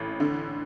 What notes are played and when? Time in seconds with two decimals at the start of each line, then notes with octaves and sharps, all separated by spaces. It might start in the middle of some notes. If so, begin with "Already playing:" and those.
Already playing: A1
0.20 D3